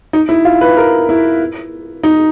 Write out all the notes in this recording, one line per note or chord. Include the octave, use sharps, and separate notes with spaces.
D#4
E4
F4
B4
A#4
E4
D#4